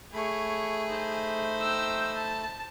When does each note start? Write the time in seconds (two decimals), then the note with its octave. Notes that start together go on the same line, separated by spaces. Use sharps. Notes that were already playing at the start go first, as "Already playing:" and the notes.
0.14 A3 G#4 C#5 B5
0.89 D#4 C5
1.59 G5 E6
2.15 A5